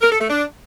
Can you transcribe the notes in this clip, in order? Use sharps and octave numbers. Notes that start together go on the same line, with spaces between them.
A#4
A4
A3
D4